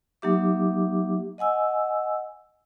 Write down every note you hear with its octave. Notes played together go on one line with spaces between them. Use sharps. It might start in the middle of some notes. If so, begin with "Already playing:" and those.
F#3 A#3 D#4 G4 E5 D6
D#5 F#5 G#5 E6